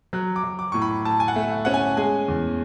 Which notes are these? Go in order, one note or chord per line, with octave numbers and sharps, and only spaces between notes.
F#3 F#6
D6
F#3
D6
A2 C#6
B5
A2 A5
G#5
F#5
A3
F#5
C#4 F#5
G#5
G#3 G#5
E2